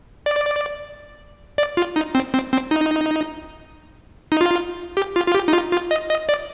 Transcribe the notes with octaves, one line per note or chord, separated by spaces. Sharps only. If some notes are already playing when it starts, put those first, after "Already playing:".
D5
D5
F4
D#4
C4
C4
C4
D#4
D#4
F4
G4
F4
F4
G4
D#4
F4
F4
D#5
D#5
D5